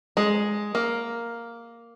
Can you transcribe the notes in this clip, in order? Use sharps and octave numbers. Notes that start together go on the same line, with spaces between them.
G#3
A#3